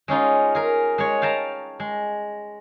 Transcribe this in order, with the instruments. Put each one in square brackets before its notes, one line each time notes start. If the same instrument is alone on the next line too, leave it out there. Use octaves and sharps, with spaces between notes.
[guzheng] G#3 C#4 D#4 F4
G#4 A#4
G#3 C#5
F5 G5 A5 A#5
G#3